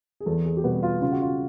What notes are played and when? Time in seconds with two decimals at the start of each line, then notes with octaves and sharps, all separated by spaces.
0.20 G#4
0.26 E2 A4
0.46 G#4
0.57 G4
0.64 B2 G3 B3 F#4
0.83 F4
1.02 C#3 F4
1.12 F#4
1.22 F4